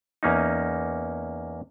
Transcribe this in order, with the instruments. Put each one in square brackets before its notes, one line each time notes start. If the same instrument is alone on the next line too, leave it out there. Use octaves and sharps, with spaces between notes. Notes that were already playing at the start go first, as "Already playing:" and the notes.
[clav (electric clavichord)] E2 A#3 C#4 D#4